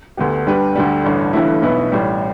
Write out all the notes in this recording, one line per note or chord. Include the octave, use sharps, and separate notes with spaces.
D2 D3 B3 G4
G2 G3 D4 G4 B4
D2 D3 G3
A1 G2 D3
G1 G2 E3 A3 E4
B1 B2 B3 E4 B4
A1 A2 G3